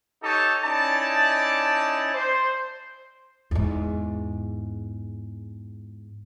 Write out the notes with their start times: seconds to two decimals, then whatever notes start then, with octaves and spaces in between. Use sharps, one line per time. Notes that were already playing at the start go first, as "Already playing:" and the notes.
0.23 D#4 G4 A4 C#5 A5
0.64 C#4 D#4 E4 D5 A5
2.14 C5
3.51 E2 G#2